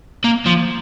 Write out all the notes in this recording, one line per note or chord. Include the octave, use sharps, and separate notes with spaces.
A#3
F3